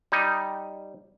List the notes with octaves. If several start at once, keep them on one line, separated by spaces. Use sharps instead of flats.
G3 D#4